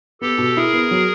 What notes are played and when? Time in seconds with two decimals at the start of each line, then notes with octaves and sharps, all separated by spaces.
0.21 B3 G4 A4
0.38 B2
0.56 E4 G#4 A#4
0.73 B3
0.91 F#3